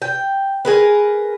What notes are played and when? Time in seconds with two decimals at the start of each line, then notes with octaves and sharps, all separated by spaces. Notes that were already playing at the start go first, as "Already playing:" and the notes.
0.02 G5
0.65 G#4 A#4 B4